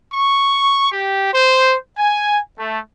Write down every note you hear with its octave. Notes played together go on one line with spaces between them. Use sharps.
C#6
G4
C5
G#5
A3